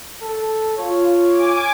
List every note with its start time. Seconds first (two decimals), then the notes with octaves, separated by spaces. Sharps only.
0.22 A4
0.78 F4 C#5
1.31 G#5 D6